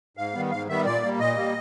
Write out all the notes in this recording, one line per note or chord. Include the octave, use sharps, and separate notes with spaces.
G#2 F5
D#3 G3 B3
G#2 F5
D#3 G3 B3 E5
A#2 D5
G3 A#3
A#2 D#5
G3 A#3